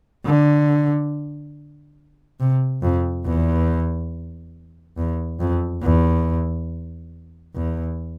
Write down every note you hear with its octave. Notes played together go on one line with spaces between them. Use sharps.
D3
C3
F2
E2
E2
F2
E2
E2